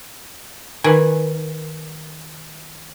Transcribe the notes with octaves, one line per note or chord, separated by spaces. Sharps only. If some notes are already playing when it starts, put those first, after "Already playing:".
D#3 B4 G#5